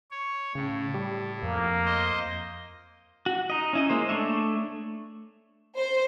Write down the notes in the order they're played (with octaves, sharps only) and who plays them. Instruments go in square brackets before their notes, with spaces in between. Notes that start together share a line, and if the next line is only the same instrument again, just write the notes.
[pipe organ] C#5
[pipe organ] A2 [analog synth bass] C#3
[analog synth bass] G3
[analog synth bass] F2 [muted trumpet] A#3
[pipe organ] C5 D#5
[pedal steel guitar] F#4
D#4 D#5
C#4 E4 D#5
G#3 A#3 C5
A3 D4 C#5 E5
[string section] C5